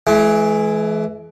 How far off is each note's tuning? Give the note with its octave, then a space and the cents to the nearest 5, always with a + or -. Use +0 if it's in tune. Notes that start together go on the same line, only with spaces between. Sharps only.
E3 +10 G#3 +45